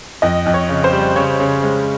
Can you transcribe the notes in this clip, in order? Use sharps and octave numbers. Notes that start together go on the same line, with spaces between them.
F2 D#5
F2
C#5
C#3
C5
G3
C#3 C#5
C#3
G#3